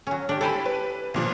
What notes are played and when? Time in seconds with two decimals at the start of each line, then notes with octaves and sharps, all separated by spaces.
0.07 F#3 C#4
0.29 D4 G4
0.41 E4 G4 A4 C5 G#5 B5
0.66 B4
1.14 B1 A#2 F3